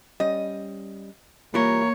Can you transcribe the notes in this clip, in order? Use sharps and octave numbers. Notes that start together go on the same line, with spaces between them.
G3 C#4 D#5
E3 G3 A#3 F4 A#4 C#5 B5